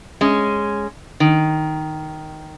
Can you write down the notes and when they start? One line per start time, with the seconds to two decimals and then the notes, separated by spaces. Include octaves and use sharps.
0.21 G#3 C#4
1.20 D#3